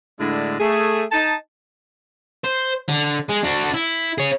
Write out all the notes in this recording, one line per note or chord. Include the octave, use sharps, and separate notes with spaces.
A2 D3 G#3 D4 E4
A3 G#4
D#4 A5
C5
D3
G#3
D4 F#4
E4
G#4 C#5